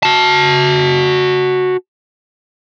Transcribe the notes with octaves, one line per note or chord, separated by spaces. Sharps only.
F#4 A5